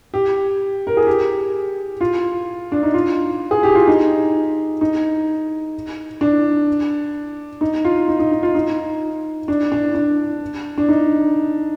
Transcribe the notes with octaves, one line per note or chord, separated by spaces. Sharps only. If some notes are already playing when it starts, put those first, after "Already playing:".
G4
A#4
G#4
G4
F4
D4
D#4
F4
G#4
G4
F4
D#4
D#4
D4
D#4
F4
D#4
D#4
D#4
F4
D#4
D4
D4
D4
D4
D#4